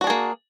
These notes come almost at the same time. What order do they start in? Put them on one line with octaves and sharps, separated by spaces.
F#4 D4 G#4 A#3